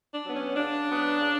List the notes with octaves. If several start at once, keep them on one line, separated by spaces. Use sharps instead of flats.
D4
F#3 B3
C#4
C#3 D4
F#3 B3
C#3